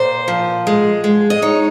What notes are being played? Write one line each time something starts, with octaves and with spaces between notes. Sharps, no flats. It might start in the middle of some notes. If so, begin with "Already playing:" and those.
Already playing: A#2 C5
F3
G#3
G#3
D#5
D#4 C#5